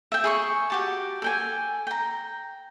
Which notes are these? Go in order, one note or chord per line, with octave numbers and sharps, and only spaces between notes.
E5 G5
G#4 C6 C#6
F#4 G4 A5
A4 G5 G#5
G5 A#5